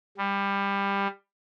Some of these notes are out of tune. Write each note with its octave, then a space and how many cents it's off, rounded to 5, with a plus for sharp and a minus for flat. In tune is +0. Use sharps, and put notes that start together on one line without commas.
G3 +20